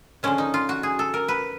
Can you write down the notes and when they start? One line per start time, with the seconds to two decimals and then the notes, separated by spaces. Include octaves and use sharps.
0.23 D3 F3 G#3 C#4
0.38 D#4
0.54 F4
0.69 F#4
0.83 G#4
0.99 A4
1.14 A#4
1.28 B4